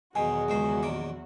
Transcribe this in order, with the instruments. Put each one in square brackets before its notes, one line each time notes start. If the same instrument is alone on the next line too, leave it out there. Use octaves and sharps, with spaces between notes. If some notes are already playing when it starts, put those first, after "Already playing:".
[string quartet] E2 F#3 F#4 [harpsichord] B2 D#3 [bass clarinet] G#4 [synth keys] G#5
[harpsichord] C#2 D#3 C5
A#1 D#3 D6